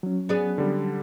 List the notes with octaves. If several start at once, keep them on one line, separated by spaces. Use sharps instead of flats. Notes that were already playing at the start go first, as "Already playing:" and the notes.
F#3 C#4
B3 D4 G#4
D3 G3